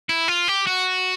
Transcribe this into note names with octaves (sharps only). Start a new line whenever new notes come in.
E4
F4
G4
F#4